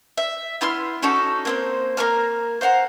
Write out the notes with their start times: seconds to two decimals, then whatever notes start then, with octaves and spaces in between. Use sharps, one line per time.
0.17 E5
0.61 B3 E4 C6 F6
1.02 C#4 D#4 F#4 A4
1.45 A#3 C4 C5
1.97 A#3 A#4 A#5 F6
2.61 C5 F5 F#5 A#5